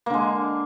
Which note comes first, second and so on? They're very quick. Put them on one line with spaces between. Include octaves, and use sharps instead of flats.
A#3 D3 G#3